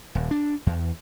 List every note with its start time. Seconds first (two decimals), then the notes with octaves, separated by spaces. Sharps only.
0.15 D#1
0.31 D4
0.67 E2